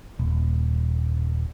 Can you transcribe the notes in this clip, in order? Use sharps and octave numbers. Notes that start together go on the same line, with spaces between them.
D#1